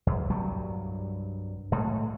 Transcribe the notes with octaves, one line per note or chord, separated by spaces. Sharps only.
E2
C2 G2 F#3 G3
A2 G#3 A3